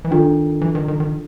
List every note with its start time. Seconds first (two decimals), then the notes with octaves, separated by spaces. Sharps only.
0.05 E3
0.11 D#3 D4 F4 A4
0.61 E3
0.75 D#3
0.88 D#3
1.00 D#3